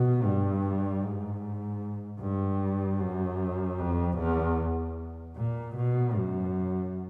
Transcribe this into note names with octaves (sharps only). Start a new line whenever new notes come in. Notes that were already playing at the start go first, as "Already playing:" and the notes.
Already playing: B2
G2
G#2
G2
F#2
F2
E2
A#2
B2
F#2